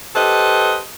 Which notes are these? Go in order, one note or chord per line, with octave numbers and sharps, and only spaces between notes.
G4 A4 B4 C5 D#5